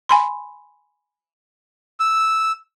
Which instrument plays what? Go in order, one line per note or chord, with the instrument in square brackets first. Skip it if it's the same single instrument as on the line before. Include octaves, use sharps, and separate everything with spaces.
[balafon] G#5 B5 C6
[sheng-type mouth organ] E6